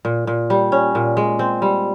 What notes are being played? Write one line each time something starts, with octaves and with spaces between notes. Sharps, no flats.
A#2
A#2
G3
C#4
A#2
G#3
C4
G3